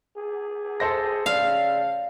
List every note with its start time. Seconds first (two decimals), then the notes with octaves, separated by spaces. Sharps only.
0.17 G#4
0.80 A4 C5 A#6
1.26 C#3 D5 F5